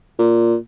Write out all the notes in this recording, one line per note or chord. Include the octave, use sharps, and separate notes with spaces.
A#2